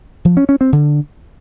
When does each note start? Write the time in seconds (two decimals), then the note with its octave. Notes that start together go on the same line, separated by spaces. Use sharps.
0.25 F3
0.37 C#4
0.49 C#4
0.61 C4
0.73 D3